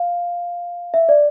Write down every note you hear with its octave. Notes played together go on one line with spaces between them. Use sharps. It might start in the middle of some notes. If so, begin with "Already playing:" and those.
Already playing: F5
E5
D5